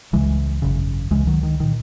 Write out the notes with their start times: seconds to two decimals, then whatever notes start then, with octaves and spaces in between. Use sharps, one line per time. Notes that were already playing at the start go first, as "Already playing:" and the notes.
0.13 C#2 C#3 E3 G#3
0.62 G#1 F#2 C#3
1.11 C#2 C#3 E3 G#3
1.27 D#3 F#3
1.43 D#3
1.60 A#2 D#3